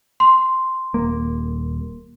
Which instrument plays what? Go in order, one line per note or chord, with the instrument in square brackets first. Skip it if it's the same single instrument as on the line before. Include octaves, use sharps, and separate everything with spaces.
[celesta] C6
[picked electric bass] D#1 A#3